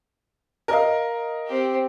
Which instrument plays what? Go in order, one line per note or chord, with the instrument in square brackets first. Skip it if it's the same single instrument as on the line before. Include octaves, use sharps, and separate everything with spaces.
[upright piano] A#4 D#5 F5
[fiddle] C4 G4